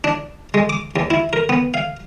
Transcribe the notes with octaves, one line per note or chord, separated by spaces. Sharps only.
D4
G#3
D6
D#2
E4
A#4
B3
F5